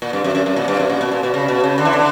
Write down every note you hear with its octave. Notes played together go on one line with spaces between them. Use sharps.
A#2
G2
F#2
F#2
F#2
A#2
G2
F#2
A#2
B2
A#2
B2
C#3
B2
C#3
D3
E3
D3